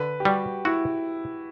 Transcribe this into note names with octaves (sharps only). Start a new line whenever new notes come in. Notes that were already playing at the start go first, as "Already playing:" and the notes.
Already playing: D3 B4
G4
G3 F#4
E4 F#4